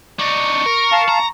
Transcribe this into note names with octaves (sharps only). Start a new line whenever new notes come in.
D4 D#4 C#6
A#4
F5 A5
A#5